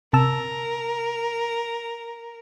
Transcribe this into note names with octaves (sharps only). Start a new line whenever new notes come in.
C3 A#4 A5 E6